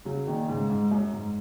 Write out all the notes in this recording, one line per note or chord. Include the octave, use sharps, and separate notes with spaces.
C#3 F#3
A#2 D#3
G#2 C#3
G#2
F#2
G#2